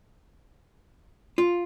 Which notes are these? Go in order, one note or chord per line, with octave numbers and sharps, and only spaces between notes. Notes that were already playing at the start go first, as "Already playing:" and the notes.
F4